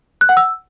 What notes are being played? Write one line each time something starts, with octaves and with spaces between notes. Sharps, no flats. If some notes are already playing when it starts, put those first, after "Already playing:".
F#6
F#5
E6